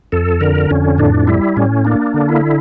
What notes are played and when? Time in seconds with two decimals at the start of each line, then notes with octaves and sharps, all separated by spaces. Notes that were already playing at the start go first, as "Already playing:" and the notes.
0.12 F2 A4
0.41 D3 A#4
0.71 F2 C#4
0.98 A2 D4
1.27 G3 E4
1.57 A2 C#4
1.85 A#3 D4
2.14 D3
2.29 E4